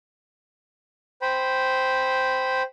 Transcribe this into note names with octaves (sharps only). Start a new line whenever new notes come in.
C5 G5 B5